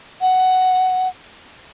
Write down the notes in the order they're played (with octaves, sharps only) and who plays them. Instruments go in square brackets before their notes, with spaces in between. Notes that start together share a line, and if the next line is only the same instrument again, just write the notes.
[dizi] F#5